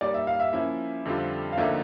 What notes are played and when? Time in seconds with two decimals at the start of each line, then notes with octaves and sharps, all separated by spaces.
0.01 G3 A#3 D#4 D5
0.14 E5
0.27 F5
0.40 E5
0.53 F3 A#3 C#4 E4 E5
1.05 F2 D3 G3 C4 F4
1.52 F5
1.57 D2 D3 F3 A#3 D#4 E5